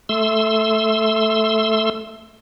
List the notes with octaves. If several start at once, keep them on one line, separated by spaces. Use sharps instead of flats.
A3 C6 E6